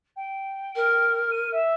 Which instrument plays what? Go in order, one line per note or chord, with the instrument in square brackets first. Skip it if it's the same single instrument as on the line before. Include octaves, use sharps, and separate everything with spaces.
[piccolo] G5
[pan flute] A#4
[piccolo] D#7
E5